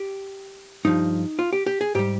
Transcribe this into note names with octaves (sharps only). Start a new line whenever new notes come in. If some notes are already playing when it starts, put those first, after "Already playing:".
Already playing: G4
G2 F3 D#4
F4
G4
G4
G#4
G#2 G3 G4